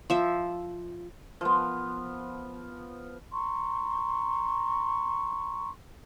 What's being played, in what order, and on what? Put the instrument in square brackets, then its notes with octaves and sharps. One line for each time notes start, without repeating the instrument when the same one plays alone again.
[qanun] F3 E5
[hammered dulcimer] F3 B3
[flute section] A#5 C6 C#6